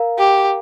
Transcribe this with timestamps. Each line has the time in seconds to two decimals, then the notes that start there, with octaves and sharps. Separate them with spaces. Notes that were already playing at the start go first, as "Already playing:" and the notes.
Already playing: A#4 F5 A#5
0.18 G4